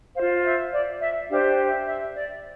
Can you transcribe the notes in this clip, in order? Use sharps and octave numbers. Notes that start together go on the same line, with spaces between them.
F4 C5 F5
E5
D5
E5
D4 G4 C5 F5
E5
E5
D5